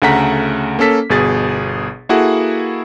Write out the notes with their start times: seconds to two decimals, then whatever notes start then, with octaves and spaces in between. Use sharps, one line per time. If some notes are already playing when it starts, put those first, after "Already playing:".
0.02 D2 C#3 A3 F#5 A#5 B6
0.79 A#3 C#4 A4 B6
1.10 G1 B2 G#4 A6
2.09 A#3 E4 F#4 G#4 A4 F#5